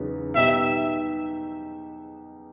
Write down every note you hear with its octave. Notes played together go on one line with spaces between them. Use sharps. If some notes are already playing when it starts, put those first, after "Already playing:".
Already playing: E2 C#3 F#3 B3 D#4
B2 G3 B3 D#4 G4 E5